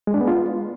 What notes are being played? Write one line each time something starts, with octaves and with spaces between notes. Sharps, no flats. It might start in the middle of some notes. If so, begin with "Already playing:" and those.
G#3
D4
B3
F4